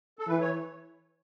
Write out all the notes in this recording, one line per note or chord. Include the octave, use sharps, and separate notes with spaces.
A4
E3 B4
C#5